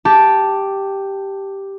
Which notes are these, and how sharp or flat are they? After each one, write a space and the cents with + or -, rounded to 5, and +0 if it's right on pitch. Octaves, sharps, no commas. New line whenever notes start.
G4 +0 A5 +0